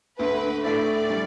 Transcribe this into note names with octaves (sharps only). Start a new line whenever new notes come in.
D2 D3 A3 B4
A2 A3 E4 D5
D3 G3